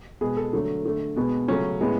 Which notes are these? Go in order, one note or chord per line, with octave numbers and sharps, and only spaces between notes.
B2 G#3 B3 G#4
A4
D3 F#3 A3
D3 A3
B2 G#3 B3
C#3 F#3 A3 C#4
A2 G#3 B3